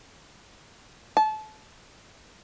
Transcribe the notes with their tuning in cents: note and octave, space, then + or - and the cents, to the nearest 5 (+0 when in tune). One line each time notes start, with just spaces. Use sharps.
A5 -30